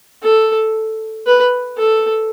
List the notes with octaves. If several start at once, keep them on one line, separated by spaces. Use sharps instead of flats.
A4
B4
A4